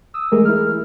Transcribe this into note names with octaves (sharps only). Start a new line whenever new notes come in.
D#6 E6
E3 G#3 A3 G4 G#4 A#4
E4 F6